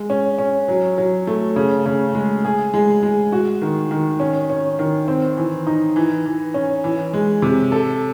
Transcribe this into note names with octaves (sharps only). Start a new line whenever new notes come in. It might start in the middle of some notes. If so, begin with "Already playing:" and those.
Already playing: G#3
C#4
C#4
F#3
F#3
A3
C#3
C#3
G#3
G#4
G#3
G#3
F#4
D#3
D#3
C#4
C#4
D#3
C4
E3
D#4
E3
E3
C#4
E3
G#3
C3
A4